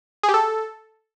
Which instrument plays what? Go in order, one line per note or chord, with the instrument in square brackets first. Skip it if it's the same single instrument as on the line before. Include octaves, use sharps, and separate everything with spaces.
[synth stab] G#4
G4
A4